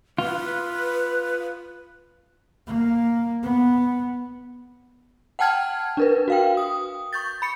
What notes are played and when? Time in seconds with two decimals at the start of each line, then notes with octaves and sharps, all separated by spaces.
0.18 F4 B4
2.67 A#3
3.43 B3
5.39 F#5 G5 A5 F6 G#6
5.97 D4 A#4 B4
6.28 F#4 F5 G5
6.57 D#6
7.13 C#6 G6 A6
7.42 B5 C#7